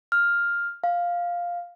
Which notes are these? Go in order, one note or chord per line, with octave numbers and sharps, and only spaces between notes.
F6
F5